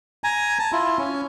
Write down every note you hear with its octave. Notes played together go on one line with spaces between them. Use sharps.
G#5 A#5
A5
E4 F4
C#4